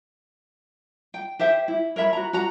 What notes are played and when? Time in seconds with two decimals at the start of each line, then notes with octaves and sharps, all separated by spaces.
1.14 G5
1.39 G4 C5 E5 G5
1.68 E4
1.96 A#4 C#5 E5 B5
2.13 F#4 A#5
2.33 F#4 A#5